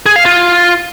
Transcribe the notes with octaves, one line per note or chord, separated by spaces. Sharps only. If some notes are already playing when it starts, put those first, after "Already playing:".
G#4
F5
F4